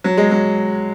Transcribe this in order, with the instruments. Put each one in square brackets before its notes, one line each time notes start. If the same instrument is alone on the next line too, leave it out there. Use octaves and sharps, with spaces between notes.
[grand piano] F#3
G#3
F#3